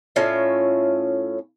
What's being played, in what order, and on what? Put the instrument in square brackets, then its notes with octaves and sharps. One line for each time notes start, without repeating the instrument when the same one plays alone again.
[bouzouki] A2 C#4 F4 E5